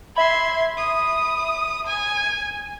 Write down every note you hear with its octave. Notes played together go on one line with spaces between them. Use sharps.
E5 B5 C6 G#6
D#6
G#5